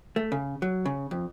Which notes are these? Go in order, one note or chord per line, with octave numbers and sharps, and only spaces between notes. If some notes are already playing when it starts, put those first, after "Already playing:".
A3
C#3
F#3
C#3
F2